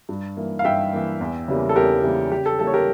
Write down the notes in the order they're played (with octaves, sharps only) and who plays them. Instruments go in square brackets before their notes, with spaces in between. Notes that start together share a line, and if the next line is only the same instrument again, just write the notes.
[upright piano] G2
E3 A#3
F5
G2 E5 G5
E3 A#3
E2
C#3 E3 G3 A#3
A4
E2 G4 A#4
C#3 E3 G3 A#3
C#3 G4
A4
E3 G3 A#3 A4
C#5
G4 A#4